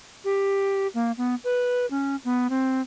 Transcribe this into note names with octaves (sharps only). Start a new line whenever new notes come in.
G4
A#3
B3
B4
C#4
B3
C4